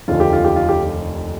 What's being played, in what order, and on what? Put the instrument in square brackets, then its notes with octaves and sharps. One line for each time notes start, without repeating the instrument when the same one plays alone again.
[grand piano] F1 D#2 D3 F3 F4
G4
F4
G4
F4
G4